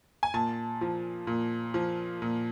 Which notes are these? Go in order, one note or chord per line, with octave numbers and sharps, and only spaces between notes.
G#5
A#2 A5
F3
A#2
F3
A#2